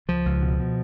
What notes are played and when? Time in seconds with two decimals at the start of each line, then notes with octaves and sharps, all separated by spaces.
0.08 C#2 F3
0.25 C#2
0.42 B2
0.60 B2